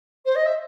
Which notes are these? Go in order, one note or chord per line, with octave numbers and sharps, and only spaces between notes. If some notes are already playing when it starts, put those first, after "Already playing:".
C5
D#5
E5